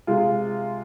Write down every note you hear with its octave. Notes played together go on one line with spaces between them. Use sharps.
C3 G#3 F4